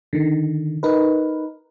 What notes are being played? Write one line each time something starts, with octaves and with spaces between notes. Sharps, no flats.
D3 D#3
D#4 A#4 B4